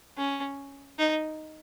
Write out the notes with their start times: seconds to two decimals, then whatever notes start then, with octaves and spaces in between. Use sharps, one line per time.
0.17 C#4
0.99 D#4